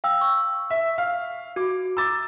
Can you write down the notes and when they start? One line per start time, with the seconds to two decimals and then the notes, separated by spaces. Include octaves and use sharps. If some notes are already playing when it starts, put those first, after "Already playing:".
0.04 F5 G5 E6
0.21 C#6 E6
0.70 E5
0.98 F5
1.56 F#4 D6
1.97 A#5 D6 E6 A6